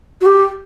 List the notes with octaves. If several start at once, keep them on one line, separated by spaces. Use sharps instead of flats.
F#4
G4